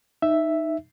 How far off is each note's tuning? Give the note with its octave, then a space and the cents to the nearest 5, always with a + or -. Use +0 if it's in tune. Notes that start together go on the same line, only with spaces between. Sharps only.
D#4 -5 E5 +0